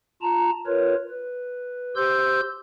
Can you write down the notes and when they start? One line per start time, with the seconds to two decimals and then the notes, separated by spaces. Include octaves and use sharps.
0.22 F4 A5 A#5
0.67 F4 A#4 B4 C#5
1.10 B4
1.96 G4 C5 C6 E6 G6